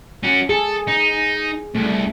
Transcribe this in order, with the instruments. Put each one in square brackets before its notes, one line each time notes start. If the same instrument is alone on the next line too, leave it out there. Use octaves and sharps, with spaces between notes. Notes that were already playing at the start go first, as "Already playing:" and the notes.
[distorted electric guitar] C#4 F#4
[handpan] G#4 [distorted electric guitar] A4
[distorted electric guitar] D#4
[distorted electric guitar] C2 [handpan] A3